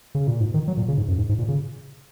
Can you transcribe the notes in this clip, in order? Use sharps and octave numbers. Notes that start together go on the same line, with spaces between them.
C#3
A#2
G#2
D#3
F#3
A#2
C#3
G#2
F#2
G#2
G#2
A#2
C#3